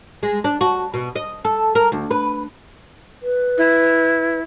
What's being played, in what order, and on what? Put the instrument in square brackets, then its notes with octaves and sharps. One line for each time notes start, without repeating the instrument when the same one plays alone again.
[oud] G#3
D4
F#4
B2
D#5
A4
A#4
D2
B4
[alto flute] B4
[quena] E4